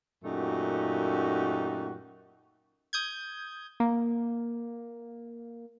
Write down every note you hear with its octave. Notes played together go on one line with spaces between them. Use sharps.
F#2 A#2 A3 D#4 F#4 G4
D#6 G6 G#6
A#3